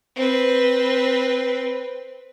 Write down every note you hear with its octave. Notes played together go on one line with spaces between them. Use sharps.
C4 B4